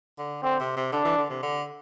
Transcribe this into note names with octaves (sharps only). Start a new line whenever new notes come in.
D3
D3 C4
C3
C3
D3 D4
E3
D3
C3
D3